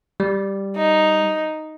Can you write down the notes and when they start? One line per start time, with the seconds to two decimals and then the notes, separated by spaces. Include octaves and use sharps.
0.20 G3
0.76 D#4